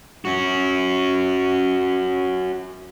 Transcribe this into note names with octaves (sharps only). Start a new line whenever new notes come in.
C#4 F#4